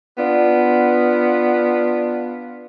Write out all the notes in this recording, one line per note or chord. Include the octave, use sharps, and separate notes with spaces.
B3 D4 F4